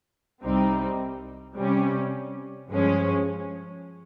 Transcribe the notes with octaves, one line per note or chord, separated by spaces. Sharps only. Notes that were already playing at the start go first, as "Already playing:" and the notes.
C2 C3 G3 C4 D#4
C3 G3 C#4
G2 F3 G#3 C#4